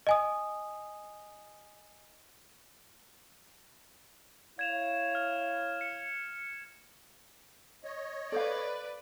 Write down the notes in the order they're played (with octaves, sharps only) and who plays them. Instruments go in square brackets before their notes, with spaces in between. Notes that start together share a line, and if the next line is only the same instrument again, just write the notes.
[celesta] D#5 G#5 D#6
[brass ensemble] E4 C#5 F5 [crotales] G#6 E7 F7
[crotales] F6
C#7
[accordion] C#5 D#5
[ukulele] A4 C5 F5 [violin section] B4 D5